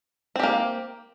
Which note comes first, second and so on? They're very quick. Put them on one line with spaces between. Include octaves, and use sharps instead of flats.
C4 G4 A#3